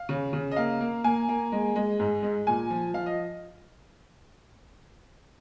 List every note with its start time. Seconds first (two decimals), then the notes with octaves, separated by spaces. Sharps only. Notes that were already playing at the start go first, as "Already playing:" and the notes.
Already playing: F5
0.09 C#3
0.33 C#3
0.52 D#5
0.56 A#3 F5
0.81 A#3
1.04 A#3 G#5
1.29 A#3
1.52 G#3
1.76 G#3
2.00 G#2
2.22 G#3
2.47 A#2 G#5
2.70 F3
2.94 F3 F5
3.06 D#5